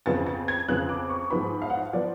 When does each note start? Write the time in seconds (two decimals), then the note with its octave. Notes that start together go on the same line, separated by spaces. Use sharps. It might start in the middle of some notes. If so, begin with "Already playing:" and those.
0.06 F2 C#3 F3 B3 A6
0.26 A6
0.48 G#6
0.68 F2 C#3 F3 B3 F#6
0.89 D6
1.09 C#6
1.30 G#2 F3 B3 B5
1.62 F5
1.70 F#5
1.77 F5
1.93 F3 B3 D5